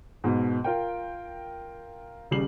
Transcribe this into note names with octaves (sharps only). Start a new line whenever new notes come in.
G#2 B2
F4 A#4 G5
D#1 C#3 G3 C7 F#7